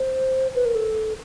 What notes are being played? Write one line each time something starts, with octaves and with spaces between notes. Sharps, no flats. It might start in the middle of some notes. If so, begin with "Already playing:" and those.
Already playing: C5
B4
A#4
A4